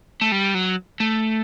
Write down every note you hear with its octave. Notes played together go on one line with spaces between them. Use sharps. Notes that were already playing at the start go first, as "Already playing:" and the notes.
A3
G3
F#3
A3